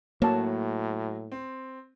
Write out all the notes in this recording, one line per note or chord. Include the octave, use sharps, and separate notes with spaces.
A2 F#3 A#3 F#4 C#5 A5
C4